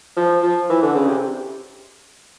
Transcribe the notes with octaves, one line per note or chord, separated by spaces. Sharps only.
F3
F3
E3
D3
C#3
C3